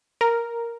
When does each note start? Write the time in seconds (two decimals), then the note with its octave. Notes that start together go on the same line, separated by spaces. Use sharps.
0.21 A#4